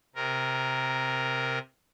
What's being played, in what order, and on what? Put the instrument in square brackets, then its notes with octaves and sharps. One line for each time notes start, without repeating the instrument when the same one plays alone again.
[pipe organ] C3 A#4